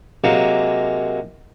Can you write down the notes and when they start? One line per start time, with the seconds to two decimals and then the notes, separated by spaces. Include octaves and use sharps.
0.24 C3 F#3 G#3 A#3